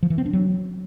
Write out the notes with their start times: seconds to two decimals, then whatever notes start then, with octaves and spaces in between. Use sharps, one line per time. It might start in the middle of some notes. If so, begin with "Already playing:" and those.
0.03 F3
0.10 E3
0.18 C4
0.26 D4
0.33 F#3